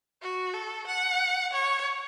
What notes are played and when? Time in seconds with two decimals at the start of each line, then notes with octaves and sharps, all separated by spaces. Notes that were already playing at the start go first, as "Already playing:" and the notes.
0.22 F#4
0.54 A4
0.87 F#5
1.53 C#5